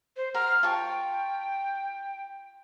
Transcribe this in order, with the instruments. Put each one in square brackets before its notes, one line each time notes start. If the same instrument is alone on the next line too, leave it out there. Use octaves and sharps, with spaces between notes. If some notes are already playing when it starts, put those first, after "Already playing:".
[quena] C5
[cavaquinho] A#4 F#5 C6 [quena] F6
[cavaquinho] F4 A5 C#6 [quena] G5